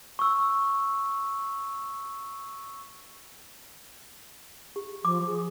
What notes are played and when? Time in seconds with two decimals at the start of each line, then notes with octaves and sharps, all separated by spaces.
0.19 C#6 E6
4.76 G4
5.05 F3 D6
5.26 G#4